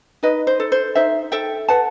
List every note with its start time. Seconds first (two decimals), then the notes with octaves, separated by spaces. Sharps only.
0.23 D#4 B4 D#5
0.47 C5
0.60 A4
0.72 C5
0.95 D#4 C5 E5
1.32 A4 E5 G5
1.68 B4 F#5 A5